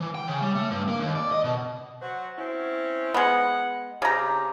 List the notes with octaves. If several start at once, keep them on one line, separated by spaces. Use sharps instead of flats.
E3
G5
C#3
G3
A3
G2
A#3
D#2
D5
D#5
B2
F#3 F#4 C5
C4 C#4 E4
G#3 B3 F#5
C#3 C4 G4 A#5